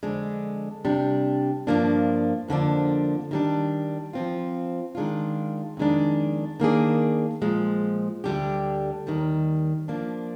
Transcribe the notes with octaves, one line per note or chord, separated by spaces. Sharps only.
F2 D3 G#3 D4
C3 G3 D4
G2 F3 A#3 D4
F2 D3 F3 A#3 D4
D#3 G3 D4
F3 C4 F4
D#3 G#3 D4 F4
F2 D#3 G#3 D4
D#3 A#3 D4 G#4
A#2 F3 G#3
D2 D3 G3 D4 G4
D#2 D#3 G3
F3 A#3 D4